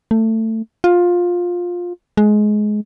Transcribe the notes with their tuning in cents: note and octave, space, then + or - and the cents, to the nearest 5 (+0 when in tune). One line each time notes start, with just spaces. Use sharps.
A3 +20
F4 +15
G#3 +20